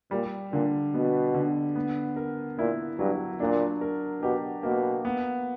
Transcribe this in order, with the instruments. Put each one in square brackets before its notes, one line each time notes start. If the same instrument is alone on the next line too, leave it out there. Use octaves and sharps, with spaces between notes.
[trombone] A#2 [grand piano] G3
[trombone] A#2 [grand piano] D3
[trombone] B2 [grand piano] B3
[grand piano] D3
B3
A#4
[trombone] A#2 [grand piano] E4
[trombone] G2 [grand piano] F#3
[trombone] A#2 [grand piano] D4
[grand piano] A#4
[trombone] B2 [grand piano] G4
[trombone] B2 [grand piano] A#3
[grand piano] B3